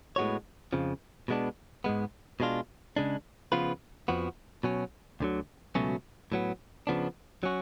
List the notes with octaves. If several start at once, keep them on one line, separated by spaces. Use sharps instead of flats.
A2 G#3 B3 F#4 C#5
F2 C#3 F3
B2 G#3 B3 D4
G#2 G#3 B3
B2 G#3 D4 F4
C#3 G#3 D4
C#3 F3 B3 F4 B4
F2 F3 B3 F#4
B2 F#3 C#4
D2 D3 F#3
C#2 B2 F#3 A3 C#4
A2 F#3 B3
C#3 F3 B3 D4
F#3 C#4 F#4